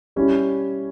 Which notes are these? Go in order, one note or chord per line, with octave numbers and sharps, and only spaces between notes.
G3 C#4 E4 G4